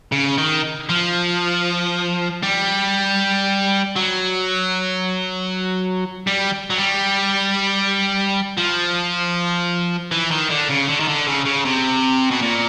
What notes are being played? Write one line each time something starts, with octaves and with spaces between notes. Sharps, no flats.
C#3
D#3
F3
G3
F#3
G3
F#3
G3
F3
E3
D#3
D3
C#3
D3
D#3
D3
C#3
C#3
C3
B2
A#2